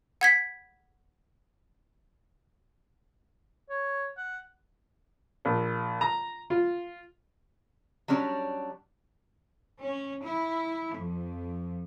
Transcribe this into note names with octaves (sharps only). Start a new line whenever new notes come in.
F#5 G#6 B6
C#5
F#5
A#1
A#5
F4
F#3 G3 C#4 D4
C#4
E4
F2